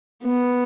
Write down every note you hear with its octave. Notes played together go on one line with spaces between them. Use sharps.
B3